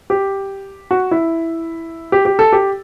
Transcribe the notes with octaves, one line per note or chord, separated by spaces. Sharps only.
G4
F#4
E4
G4
G4
A4
G4